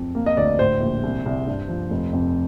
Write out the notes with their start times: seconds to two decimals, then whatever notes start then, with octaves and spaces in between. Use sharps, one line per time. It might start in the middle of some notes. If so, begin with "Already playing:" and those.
Already playing: F2
0.15 A#3
0.26 D#5
0.37 D2 D5
0.59 A2 C5
0.81 A#1
1.03 C2
1.26 C2
1.47 G2
1.68 F3
1.90 F1
2.13 F2